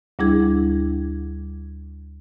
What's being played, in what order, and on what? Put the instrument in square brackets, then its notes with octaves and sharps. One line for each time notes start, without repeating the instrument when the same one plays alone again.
[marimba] D2 G3 D4 E4 G#4 G#6